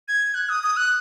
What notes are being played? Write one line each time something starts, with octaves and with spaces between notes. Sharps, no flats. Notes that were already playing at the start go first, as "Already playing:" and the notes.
G#6
F#6
D#6
D#6
F#6